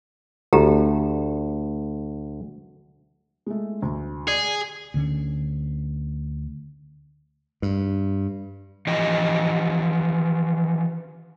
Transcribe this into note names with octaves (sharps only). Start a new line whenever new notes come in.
D2 G4 A4 A#5
G#3 A3
D2
G#4 D5
D2 D3 C#4
G2
E3 F3 G4 D#5